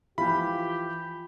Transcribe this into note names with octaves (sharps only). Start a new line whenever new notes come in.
E3 F3 F4 G4 B5